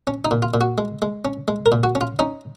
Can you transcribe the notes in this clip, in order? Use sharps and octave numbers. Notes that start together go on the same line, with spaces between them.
C#4
D#4
A#2
F4
A#2
F#4
G#3
G#3
C#4
G#3
A#4
A#2
F#4
C#4
F4
C#4 D#4